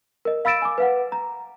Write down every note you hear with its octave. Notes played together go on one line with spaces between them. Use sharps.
A#4 D#5
F5 B5 E6 A6 D7 E7
G#5 D6
B4 F5 F#5
A#5